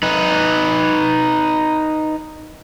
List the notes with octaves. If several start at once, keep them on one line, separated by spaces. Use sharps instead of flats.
D#4 B4